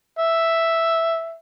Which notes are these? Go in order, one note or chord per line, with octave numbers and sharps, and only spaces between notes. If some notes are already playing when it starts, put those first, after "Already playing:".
E5